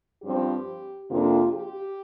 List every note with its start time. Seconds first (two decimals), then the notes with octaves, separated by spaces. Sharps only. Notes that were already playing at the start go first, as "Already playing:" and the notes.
0.23 G2 F3 C4 G4
1.09 F2 C3 A#3 D4 F4
1.53 G4